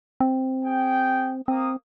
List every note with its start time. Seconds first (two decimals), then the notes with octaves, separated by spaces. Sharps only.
0.20 C4
0.64 G#4 G5
1.48 A#3 C4 D#6